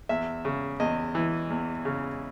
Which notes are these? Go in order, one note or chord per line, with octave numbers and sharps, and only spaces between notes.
E2 E5
C#3
E2 D#5
E3
E2
C#3